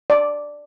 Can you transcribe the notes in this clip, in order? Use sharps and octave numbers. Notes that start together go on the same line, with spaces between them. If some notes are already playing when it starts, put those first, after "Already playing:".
D5